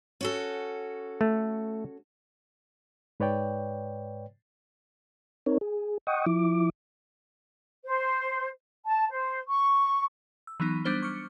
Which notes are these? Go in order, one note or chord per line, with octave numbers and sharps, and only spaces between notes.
C#4 F#4 A4
A3
G#2 B4 C#5 D5 G5
C4 D#4 A#4 C#5
G#4
D#5 F#5 G5 C#6 D#6
F3 E4 D6
C5
A5
C5
C#6
E6
E3 F#3 B3 D#4
G3 B3 D4 C5 F6 G7
C#6 D6 F6 C#7